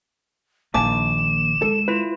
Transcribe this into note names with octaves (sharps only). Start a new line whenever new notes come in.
A#1 D#3 A#3 G#5 A5 D6 E7
G#3 A4
E4 F4 B4